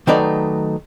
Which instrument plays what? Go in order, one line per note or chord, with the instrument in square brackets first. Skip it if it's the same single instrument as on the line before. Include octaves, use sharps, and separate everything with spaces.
[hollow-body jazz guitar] D#3 F#3 A3 D#4 B4 D5